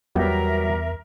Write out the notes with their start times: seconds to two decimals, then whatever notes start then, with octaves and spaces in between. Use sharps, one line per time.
0.15 E2 F#3 G3 B3 A#4 E5 G5